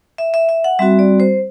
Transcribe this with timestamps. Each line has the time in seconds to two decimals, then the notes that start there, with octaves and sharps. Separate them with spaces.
0.18 E5
0.34 E5
0.49 E5
0.64 F#5
0.79 G3 C4 F#4 E5
0.99 D5
1.20 C5